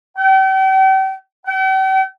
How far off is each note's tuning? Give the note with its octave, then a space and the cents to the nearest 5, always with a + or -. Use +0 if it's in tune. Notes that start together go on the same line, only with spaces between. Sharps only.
G5 -40
G5 -45